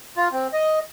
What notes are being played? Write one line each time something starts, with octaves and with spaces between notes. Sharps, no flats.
F4
C4
D#5